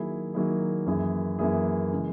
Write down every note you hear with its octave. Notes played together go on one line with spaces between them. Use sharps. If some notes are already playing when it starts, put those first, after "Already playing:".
Already playing: D#3 F#3 A#3 E4 G#4
D#3 F#3 A#3 E4 G#4
F#2 E3 A#3 E4 G#4
F#2 E3 A#3 E4 G#4
C#3 E3 G#3